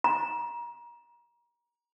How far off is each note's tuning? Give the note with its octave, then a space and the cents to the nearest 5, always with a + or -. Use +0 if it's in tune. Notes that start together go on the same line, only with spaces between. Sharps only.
A#5 +30